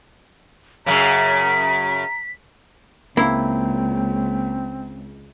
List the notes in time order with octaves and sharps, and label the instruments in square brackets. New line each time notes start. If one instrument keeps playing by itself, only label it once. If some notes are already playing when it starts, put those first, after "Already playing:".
[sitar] F#2 C#3 [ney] A#5 [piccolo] B6
[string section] C#2 [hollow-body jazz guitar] A#3 [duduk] C4 [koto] E4